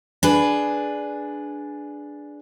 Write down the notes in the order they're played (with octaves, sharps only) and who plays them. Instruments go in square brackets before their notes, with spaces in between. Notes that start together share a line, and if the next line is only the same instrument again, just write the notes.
[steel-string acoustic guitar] D4 G#4 B4